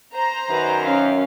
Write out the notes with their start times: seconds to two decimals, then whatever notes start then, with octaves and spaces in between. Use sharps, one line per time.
0.14 C5 A#5
0.50 F#2 D#3 B4
0.84 C#4 F5